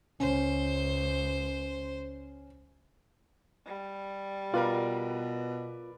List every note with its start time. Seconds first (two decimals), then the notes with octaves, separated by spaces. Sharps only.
0.20 C#2 C#4 C5
3.65 G3
4.54 B2 F4 A#4 B4 D5